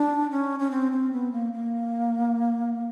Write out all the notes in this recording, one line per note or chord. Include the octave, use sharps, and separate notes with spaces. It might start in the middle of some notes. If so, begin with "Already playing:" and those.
Already playing: D4
C#4
C#4
C4
C4
B3
A#3
A#3